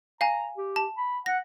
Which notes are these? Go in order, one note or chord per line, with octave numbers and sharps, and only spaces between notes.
F5 G#5 A#5
G4
A5
B5
F#5 A#6